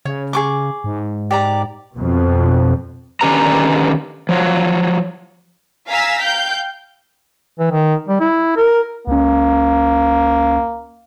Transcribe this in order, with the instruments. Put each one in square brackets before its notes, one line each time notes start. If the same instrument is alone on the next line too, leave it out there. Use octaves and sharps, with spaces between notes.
[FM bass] C#3 [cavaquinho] C#5
[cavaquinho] G#4 C#6 D6
[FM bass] G#2
[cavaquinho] G4 D5 A#5
[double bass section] F2 B2
[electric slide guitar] D3 D#3 C#4 G4 B4 A#5
F3 F#3
[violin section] F5 G#5 A#5 E6 B6
F5 G5 G6
[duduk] E3
D#3
G3
E4
A#4
[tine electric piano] C#2 C#4 [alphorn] A#3